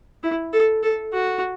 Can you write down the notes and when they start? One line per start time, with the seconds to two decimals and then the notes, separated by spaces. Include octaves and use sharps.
0.23 E4
0.53 A4
0.83 A4
1.13 F#4